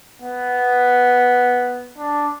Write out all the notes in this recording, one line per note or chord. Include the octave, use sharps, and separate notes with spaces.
B3
D4